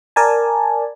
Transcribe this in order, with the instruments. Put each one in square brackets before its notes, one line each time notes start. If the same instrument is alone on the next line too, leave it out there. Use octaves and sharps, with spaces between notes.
[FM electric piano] A#4 D5 G#5 A5